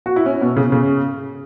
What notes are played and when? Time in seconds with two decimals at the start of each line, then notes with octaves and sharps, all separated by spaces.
0.06 F#4
0.16 E4
0.26 C#4
0.41 B2
0.56 C#3
0.72 C#3